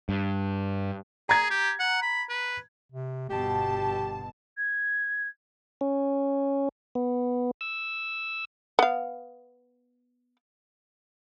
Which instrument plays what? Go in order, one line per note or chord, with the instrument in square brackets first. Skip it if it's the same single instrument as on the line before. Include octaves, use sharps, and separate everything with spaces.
[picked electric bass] G2
[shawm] G#4 [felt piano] A#5 G#6
[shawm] G4
F#5
B5
B4
[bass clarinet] C3
[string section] G1 B2 A5 [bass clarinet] G4
[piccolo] G#6
[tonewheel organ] C#4
B3
E6
[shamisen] B3 F5